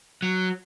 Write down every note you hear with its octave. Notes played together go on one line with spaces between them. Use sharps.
F#3